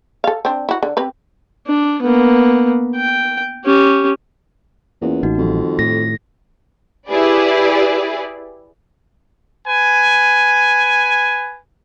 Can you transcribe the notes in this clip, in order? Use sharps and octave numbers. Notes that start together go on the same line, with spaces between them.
A4 F5
C4 D4
E4 F#4
D3
C4 G4 B4
D4
A#3 B3
G5
C#4 G4
E2 A#3 C#4 F4
A1 D#4 F#4
F2 D#3 F3 G3
A2 A#6
E4 G4 G#4 B4 D5
B4 G#5